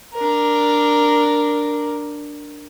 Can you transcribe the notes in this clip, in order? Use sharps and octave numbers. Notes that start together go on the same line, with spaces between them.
D4 A#4